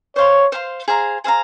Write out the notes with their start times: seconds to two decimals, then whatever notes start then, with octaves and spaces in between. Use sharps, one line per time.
0.16 C5 C#5 F5 C6
0.52 C5 F5 C6
0.88 G#4 C5 F5 A#5
1.24 G#4 C5 F5 A#5